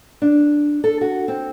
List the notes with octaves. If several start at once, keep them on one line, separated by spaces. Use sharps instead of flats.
D4
A4
F#4
C4